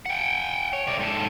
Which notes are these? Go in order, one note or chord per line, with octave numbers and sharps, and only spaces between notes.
F#5 G5
C#5
C3 D5
G#2 A4